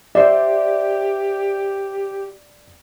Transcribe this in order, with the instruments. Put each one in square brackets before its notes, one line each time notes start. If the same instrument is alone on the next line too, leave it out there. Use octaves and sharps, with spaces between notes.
[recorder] G4 [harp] C5 E5 [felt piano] D5